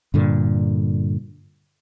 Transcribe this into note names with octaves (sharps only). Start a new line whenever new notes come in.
G2 A#2 D3